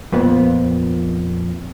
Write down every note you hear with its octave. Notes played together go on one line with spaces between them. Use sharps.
F2 A#2 B3